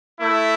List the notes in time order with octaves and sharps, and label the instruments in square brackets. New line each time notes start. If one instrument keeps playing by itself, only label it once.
[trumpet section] A3 E4